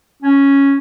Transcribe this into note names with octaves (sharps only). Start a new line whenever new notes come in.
C#4